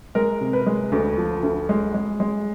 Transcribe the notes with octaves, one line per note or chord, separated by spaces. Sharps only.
G#3 A#4
C3
B4
G#3
D2
F3
D2
G#3
G#3
G#3